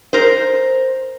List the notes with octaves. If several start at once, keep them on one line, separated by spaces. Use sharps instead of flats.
A#4 C5